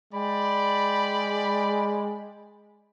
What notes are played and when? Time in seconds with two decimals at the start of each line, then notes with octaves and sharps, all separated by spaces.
0.13 G#3 D5 G5 B5